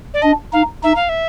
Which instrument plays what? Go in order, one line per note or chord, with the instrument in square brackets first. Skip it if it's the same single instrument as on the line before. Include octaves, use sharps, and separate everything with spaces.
[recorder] D5
[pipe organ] D4 [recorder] D#5
[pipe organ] D#4 [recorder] F5
[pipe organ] D#4 [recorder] E5
[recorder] F5
E5